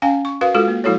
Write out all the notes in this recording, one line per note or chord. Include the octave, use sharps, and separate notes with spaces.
C#4 F5 G5 G#5
C#6
F#4 A#4 B4 F5
G#3 F4 F#4 A4
A#3
F3 G#3 E4 F#4 A4 C#5